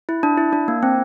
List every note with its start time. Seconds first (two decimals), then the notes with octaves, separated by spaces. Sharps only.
0.09 E4
0.23 D4
0.38 E4
0.53 D4
0.68 A#3
0.83 C4